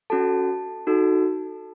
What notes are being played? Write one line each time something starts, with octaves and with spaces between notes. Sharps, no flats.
C#4 F#4 A4 A5
D#4 F#4 A4